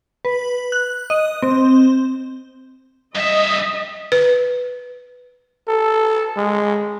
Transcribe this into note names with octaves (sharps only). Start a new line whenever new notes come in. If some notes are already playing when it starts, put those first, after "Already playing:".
B4
F#6
D#5
C4
G2 D#5 E5
B4
A4
G#3